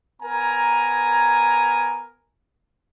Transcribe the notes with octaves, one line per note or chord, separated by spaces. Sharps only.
B3 A#4 G#5 A#5